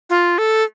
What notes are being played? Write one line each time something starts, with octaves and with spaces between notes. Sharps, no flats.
F4
A4